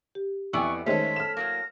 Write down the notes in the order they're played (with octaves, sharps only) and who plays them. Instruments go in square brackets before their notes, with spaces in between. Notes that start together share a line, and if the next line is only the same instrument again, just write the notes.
[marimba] G4
[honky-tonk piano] F2 [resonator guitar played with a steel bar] B3 E4 D5 [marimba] G5 G#5 E6 [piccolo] C#6
[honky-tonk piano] D#3 G#3 A3 [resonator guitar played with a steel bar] C#4 A4 [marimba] C5 C#5 [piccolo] B6
[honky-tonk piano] F6 E7
[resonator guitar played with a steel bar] A2 F#3 A#3 [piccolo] A#6